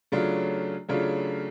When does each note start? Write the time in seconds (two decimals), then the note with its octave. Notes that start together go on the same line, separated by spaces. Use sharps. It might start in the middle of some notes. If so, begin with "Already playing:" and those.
0.12 C#3 F#3 A3 D4 F4
0.89 C#3 F#3 A3 D4 F4